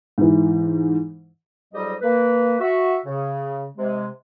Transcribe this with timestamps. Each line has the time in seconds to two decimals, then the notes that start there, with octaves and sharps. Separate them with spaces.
0.18 G#2 E3
1.74 F2 G#2 F#3 G3 G4 D#5
2.02 A#3 B4
2.60 F#4 E5
3.06 C#3
3.77 C3 G#3